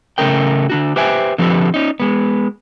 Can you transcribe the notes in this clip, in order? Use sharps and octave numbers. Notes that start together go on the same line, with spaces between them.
C#3 A3 C#4 A#4 G5
D3 D4 F#4
G4 B4 C5 E5 G5 G#5
D3 F3 C4 G4 A4 B4
C#4 D#4
G#3 B3